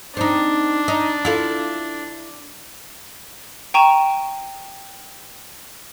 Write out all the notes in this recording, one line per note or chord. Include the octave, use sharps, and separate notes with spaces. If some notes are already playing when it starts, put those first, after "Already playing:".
C4 D4 D#4
D#4
E4 F4 A4
G5 A#5 C#6 D#7 E7